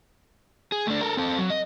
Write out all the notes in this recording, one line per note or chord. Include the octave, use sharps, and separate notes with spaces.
G#4
A3 D4
A4 A#4
C4 A4
F#3
D#5